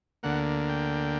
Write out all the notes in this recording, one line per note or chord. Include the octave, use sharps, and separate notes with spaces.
D2 D3 A#3 F#5
G5